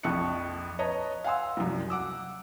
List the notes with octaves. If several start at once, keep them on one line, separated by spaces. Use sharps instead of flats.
A#1 F2 A5 C#6 F#6 C#7
B4 C#5 D#5 A5 A#5
F5 F#5 G#5 C6 E6
C2 F#2
F#5 D6 E6